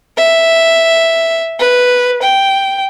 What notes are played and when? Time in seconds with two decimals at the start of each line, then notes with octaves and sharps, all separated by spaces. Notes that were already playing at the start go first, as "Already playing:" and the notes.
0.17 E5
1.60 B4
2.22 G5